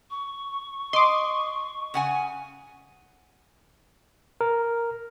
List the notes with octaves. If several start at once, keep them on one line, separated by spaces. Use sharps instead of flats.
C#6
D#5 C6 D6
C#3 F#5 G#5
A#4